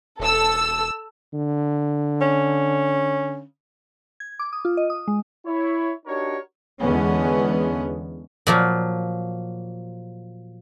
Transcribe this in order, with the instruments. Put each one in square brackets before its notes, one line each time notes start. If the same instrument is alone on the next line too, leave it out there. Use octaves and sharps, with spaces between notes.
[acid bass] E1 [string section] A4 E6
[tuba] D3
[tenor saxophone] C#4
[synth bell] G#6
D6
D#6
F4
D#5
D#6
G#3
[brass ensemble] E4 C#5
D4 D#4 F#4 G4 A#4 C#5
[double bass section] E2 D3 G#3 B3 C#4
[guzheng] A#2 F3 F#3